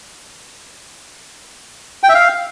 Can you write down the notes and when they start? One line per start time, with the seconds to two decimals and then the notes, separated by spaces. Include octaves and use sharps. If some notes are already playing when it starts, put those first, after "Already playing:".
2.03 G5
2.09 E5
2.15 F5